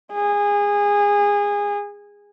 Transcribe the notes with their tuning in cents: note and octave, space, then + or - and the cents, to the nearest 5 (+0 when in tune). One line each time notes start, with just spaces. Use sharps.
G#4 -25